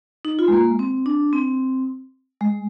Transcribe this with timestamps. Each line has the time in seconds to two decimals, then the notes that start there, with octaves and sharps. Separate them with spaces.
0.25 D#4
0.39 F4
0.48 G#3
0.52 A#3
0.79 C4
1.06 D4
1.33 C4
2.41 G#3